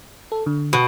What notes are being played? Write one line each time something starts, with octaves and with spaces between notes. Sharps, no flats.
A4
D3
B2